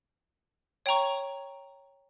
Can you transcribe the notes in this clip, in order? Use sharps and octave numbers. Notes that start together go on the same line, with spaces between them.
C#5 G5 A#5 C#6